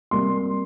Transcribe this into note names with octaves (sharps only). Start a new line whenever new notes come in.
C3 G3 A#3 C6